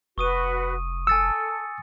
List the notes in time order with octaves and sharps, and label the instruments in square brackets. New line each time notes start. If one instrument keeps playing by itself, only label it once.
[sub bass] F1 [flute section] F#4 B4 [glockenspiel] C#6 D#6 D#7
[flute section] A4 [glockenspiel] G#5 A6 C#7 [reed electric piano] E6